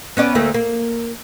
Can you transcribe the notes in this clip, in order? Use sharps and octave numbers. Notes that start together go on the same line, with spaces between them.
B3 C#4 D5
D2 A3 A#3
A#3